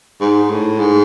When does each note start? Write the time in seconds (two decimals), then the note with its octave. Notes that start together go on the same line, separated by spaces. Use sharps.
0.21 G#2
0.50 A2
0.79 G#2